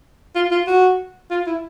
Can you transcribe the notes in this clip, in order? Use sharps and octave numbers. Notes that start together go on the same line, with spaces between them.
F4
F4
F#4
F4
E4